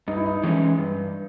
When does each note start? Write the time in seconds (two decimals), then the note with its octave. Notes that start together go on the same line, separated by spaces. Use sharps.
0.08 G2 D#4
0.17 E4
0.26 D#4
0.43 E3 G#3 C#4
0.78 G2